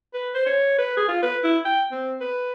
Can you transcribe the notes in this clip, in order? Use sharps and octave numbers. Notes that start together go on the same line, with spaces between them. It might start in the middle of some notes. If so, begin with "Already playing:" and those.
B4
C5
C#5
B4
G#4
F4
B4
E4
G5
C4
B4